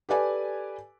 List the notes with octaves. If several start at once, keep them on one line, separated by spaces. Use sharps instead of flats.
G4 A4 B4 D5 G#5